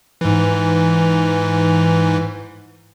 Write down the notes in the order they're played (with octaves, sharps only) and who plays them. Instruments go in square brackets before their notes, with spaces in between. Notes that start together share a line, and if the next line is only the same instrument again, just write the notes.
[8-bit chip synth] G#2 E3